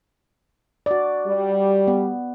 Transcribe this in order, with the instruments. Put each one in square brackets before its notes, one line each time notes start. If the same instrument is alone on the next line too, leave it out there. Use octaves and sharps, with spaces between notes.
[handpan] F#4 D5
[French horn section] G3
[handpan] B3